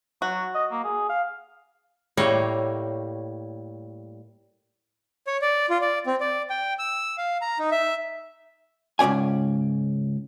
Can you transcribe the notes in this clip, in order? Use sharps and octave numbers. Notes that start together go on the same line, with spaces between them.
F#3 F#4
D#5
A#3
G#4
F5
A2 G3 A#3 C#5 A#5
C#5
D5
F4
D5
C4
D5
G5
E6
F5
A#5
D#4
E5
C#2 G#2 C#4 D5 G#5